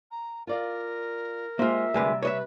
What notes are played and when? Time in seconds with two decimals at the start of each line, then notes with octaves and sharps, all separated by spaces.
0.11 A#5
0.47 F4 A#4 D5 F5
1.59 G#3 A#3 F4 G4 C5 E5
1.94 D2 C3 G3 G#3 B4
2.23 B4 C#5 D#5 E5